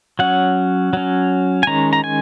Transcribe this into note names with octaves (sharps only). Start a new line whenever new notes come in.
F#3 C#4 F#5
F#3 C#4
G#5
D#3 G#3 C#4 A#5
A#5
G#5